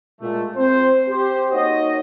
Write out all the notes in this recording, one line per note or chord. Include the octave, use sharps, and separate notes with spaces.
A#2 G#3 A3
C4 C5
G4 C5
A#3 D#4 F#4 C#5 D#5